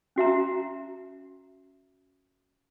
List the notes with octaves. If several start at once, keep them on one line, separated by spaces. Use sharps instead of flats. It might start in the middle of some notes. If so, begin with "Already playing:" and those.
C#4 F#4 E5 A#5